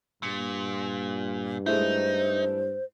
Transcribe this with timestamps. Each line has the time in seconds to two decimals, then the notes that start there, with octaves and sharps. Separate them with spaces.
0.23 G2 A#2 C#7
1.66 G#3 A3 D#4 E4 C5